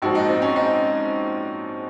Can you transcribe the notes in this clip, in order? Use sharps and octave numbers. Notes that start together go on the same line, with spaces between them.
A#1 G#2 F3 F#4
D#4
C4
C#4
D#4